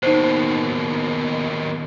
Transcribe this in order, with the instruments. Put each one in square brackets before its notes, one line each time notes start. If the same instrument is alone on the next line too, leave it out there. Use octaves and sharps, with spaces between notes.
[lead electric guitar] D#2 B2 [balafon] D#4 C5